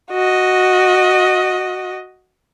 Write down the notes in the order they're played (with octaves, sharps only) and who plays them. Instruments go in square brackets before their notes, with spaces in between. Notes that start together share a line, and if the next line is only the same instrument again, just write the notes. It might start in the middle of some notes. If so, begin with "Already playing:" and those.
[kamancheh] F#4 D#5